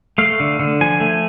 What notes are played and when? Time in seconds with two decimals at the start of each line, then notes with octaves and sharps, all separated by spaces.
0.18 A3 F5
0.40 D3
0.59 D3
0.81 F3 G#5
1.00 A3